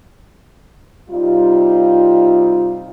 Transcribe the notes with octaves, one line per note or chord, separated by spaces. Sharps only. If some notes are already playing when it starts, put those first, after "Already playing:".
C3 G3 D#4 F4